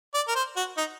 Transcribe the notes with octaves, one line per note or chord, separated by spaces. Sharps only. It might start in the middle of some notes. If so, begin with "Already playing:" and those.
D5
A#4
C5
F#4
D#4